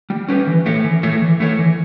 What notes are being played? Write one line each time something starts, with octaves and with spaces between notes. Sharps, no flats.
G3
C#4 G4 B4
E3
A3 E4 A4 C#5
E3
A3 E4 A4 C#5
E3
A3 E4 A4 C#5
E3